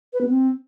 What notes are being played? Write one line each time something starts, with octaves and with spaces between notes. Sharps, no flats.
B4
B3
C4